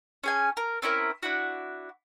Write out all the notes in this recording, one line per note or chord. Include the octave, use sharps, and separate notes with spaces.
C#4 G#4 G#5
A#4
C4 C#4 E4 A#4
D4 E4 F#4